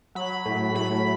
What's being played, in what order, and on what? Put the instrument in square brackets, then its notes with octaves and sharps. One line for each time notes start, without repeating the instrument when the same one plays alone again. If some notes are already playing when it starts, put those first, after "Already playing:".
[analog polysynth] F#3 B5
A2
A2 B5